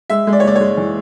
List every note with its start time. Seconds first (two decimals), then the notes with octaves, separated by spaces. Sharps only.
0.10 G#3 E5
0.27 G#3
0.33 D5
0.40 C#5
0.44 F#1 D5
0.56 C#5
0.61 G#3
0.77 E3